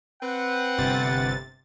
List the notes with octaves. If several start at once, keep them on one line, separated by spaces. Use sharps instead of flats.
C4 B4 F#5
G1 C3 A6